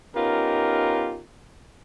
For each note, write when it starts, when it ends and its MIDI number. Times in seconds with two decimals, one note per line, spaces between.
0.16 1.22 59
0.16 1.22 61
0.16 1.22 63
0.16 1.22 65
0.16 1.22 67
0.16 1.22 70